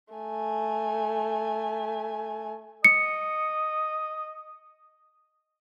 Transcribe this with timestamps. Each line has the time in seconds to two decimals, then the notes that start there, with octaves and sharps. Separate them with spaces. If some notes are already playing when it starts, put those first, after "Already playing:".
0.14 A3 G#5
2.85 D#5 C#7